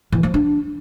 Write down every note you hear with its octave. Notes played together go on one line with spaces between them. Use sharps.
E3
F3
D4